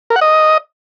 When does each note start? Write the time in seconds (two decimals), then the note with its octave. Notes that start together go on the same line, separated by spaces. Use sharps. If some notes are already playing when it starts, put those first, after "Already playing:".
0.10 A#4
0.16 F#5
0.21 D#5